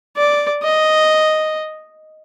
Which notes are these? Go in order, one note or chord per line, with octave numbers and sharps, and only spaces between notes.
D5
D#5